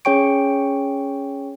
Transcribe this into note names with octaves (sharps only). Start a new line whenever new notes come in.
C#4 G#4 C#5 G5 C#6 D7